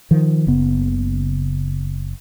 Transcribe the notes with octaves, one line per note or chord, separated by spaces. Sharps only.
D#3 F3
F#1 C#3 B3